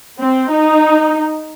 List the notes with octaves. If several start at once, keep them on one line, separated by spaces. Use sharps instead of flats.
C4
D#4